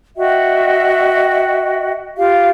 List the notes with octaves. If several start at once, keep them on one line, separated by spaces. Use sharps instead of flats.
F#4 D#5 E5 G5
F4 G4 F5